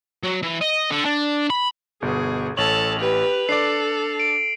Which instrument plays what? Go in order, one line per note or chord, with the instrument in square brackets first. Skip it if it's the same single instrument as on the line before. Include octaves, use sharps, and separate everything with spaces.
[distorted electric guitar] F#3
E3
D#5
D3
D4
B5
[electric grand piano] G1 B2 [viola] G#4
[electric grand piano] A1 C#5 C#6 [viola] A4 A5 [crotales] F7 F#7
[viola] G4 B4
[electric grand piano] D4 D5 [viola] A4 [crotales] C7
[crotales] D7